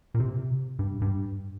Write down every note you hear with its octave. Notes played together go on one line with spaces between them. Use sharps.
A#2
C3
G2
G2